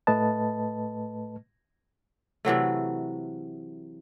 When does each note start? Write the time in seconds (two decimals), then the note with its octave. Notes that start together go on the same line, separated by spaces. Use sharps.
0.07 A2 A3 B4 D#5 A5
2.45 C3 E3 F#3 A3